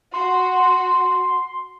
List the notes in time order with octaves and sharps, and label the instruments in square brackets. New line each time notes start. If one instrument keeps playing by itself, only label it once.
[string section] F#4 [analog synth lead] C6